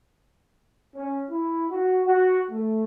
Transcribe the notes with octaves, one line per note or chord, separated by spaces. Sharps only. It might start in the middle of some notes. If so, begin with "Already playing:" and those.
C#4
E4
F#4
F#4
A3